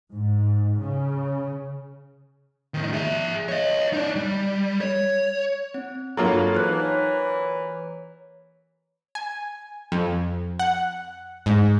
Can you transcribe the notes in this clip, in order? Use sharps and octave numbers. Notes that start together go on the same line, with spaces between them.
G#2
C#3
A2 D#3
G#4 E5
C#5 D#5
D#4 D5
G3
C#5
C4
G2 F#3 A#3 F4 G#4 A4
E3 D#4 C5 F#6
C#5
G#5
F2
F#5
G#2